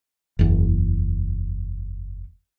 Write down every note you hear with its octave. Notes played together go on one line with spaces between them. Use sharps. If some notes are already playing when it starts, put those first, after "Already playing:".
F#1 E2